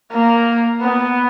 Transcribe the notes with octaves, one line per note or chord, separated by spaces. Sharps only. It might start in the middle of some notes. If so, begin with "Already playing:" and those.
A#3
B3